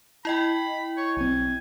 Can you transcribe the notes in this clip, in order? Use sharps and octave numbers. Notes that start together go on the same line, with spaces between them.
E4 D#5 G5 B5
C#5
B1 C4 G#5